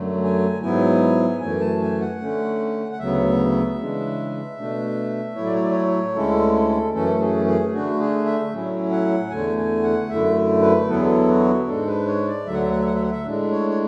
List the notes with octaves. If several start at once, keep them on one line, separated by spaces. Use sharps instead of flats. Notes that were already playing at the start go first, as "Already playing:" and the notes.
Already playing: F#2 D3 F#3 A3
G#5
G#2 F#3 B3 E4 G#5
F#2 E3 A3 G#5
A5
G#5
F#5
D3 A3 C#4
F#5
D2 C#3 F#3 B3 E5
C#3 E3 G#3 D4
B2 A3 D4
A2 F#3 A3 E4 C#5
D5
C#5
D5
C#5
D2 D3 G#3 C#4 E4 A4
A4
F#2 E3 A3 C#4 A4
G#4
G#4
D3 A3 D4 F#4
G#4
E5
A2 F#3 C#4 E4
F#5
E2 D3 A3 G#5
G#5
F#5
F#2 D3 A3 E4 E5
B4
E2 D3 F#3 B3 E4 A4
G#4
A4
F#4
G#2 G#3 D4 A4
B4
C#5
D5
D2 D3 F#3 E5
F#5
E5
F#5
E5
F#5
E5
F#5
E5
A2 G#3 D4
C#5
C#5